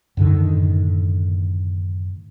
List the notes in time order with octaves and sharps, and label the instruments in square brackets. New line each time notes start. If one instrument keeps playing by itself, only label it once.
[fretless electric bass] F#2 A2 D3 D#3